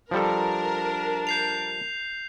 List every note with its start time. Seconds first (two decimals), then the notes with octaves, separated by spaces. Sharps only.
0.11 F3 G3 D4 A4 A#4
1.27 G6 C7 F7